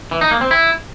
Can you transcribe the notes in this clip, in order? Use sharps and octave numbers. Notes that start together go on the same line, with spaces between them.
E3
D#4
A#3
C4
E4